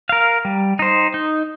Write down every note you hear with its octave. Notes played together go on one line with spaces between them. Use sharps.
A#4 F5
G3
D#4 C5
D#4